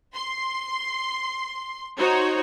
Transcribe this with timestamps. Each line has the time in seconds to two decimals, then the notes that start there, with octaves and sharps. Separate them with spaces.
0.14 C6
1.98 D#4 F#4 C5 C#5